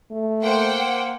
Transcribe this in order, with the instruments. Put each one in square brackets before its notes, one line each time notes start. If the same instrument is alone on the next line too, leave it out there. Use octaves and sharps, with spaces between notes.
[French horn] A3
[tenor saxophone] A#3 [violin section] C5 F#5 G5